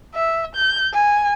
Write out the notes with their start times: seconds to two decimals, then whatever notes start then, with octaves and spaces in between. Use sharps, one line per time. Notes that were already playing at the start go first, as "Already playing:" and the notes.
0.15 E5
0.55 G6
0.93 G#5